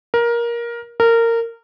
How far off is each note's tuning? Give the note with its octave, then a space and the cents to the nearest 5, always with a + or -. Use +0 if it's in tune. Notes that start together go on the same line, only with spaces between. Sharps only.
A#4 +15
A#4 -20